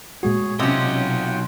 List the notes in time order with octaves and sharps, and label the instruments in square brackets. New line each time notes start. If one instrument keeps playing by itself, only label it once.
[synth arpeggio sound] A#2 G#3 F#4 [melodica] G#4 C#5
[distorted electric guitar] B1 D#5 [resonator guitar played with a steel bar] C3 C#4 [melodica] F4 F#5 G5